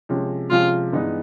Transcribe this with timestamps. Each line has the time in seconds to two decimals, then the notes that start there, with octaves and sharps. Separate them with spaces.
0.09 C3 F3 G#3 C#4
0.50 C3 F3 G#3 C#4 F4
0.92 G2 E3 G#3 B3 D#4